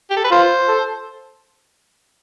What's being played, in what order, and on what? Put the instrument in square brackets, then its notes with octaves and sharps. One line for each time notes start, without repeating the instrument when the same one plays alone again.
[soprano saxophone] G4
A4
B4
[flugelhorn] F4 [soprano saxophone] C5
[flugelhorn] A4